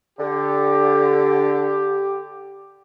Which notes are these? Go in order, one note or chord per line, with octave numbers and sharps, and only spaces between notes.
D3 G4